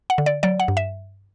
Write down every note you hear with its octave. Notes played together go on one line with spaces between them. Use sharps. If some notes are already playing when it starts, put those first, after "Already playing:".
F#5
D3
D5
F#3 D5
F#5
G2
E5